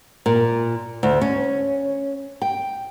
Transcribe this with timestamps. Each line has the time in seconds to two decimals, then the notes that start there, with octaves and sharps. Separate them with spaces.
0.26 A#2
1.03 D2
1.21 C#4
2.42 G5